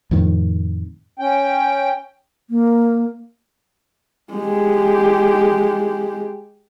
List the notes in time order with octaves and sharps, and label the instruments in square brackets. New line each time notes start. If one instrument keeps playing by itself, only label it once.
[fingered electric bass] F2 A2 D#3
[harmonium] C#4 G5
[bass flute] A#3
[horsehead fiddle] G#3 G4